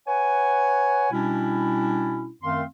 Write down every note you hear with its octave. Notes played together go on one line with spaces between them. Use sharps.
B4 C#5 F#5 G#5
B2 G3 C#4 D4 E4
F#2 D#3 A3 C4 F5 C6